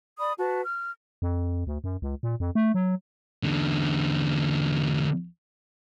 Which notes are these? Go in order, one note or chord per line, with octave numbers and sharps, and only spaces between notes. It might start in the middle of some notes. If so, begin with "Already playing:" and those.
D5 B5 D#6
F#4 B4 A5
F6
F2
D2
F#2
C#2
A#2
F2
A3
F#3
E2 D3